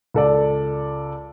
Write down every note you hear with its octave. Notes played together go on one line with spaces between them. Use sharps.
C#2 A4 D5